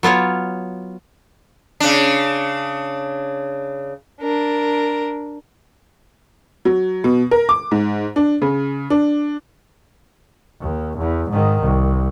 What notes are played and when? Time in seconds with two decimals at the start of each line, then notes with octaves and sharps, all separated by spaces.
0.03 F#3 B3 F4 C#5
1.80 C#3 D4
4.21 D4 A#4
6.65 F#3
7.04 B2
7.31 A#4
7.49 D6
7.71 G#2
8.16 D4
8.42 C#3
8.90 D4
10.61 D#2
10.97 E2
11.29 G#2 D#3
11.62 C2